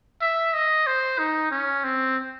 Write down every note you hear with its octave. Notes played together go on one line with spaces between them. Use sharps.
E5
D#5
C5
D#4
C#4
C4